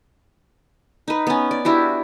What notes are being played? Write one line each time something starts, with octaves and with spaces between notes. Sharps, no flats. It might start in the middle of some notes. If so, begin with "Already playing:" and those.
D#4 B4
B3 C#4
D5
D4 E4 F#4 G4